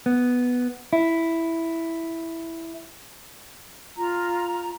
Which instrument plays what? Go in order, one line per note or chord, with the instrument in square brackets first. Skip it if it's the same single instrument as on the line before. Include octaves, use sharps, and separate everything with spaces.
[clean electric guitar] B3
E4
[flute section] F4 A#5